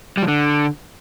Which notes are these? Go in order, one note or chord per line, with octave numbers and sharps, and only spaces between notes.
G3
F3
D3